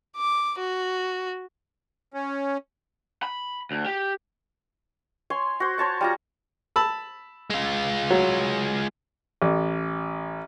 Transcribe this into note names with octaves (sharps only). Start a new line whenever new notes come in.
D6
F#4
C#4
B5
D2
G4
C#5 G#5 C6
F#4 C5
C5 C#5 A5 C#6
G3 F4 A#5
A5 B5 E6
G#3 F4
F#3
A1